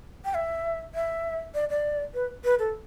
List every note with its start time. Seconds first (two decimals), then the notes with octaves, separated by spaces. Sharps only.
0.25 G5
0.35 E5
0.95 E5
1.54 D5
1.70 D5
2.14 B4
2.44 B4
2.59 A4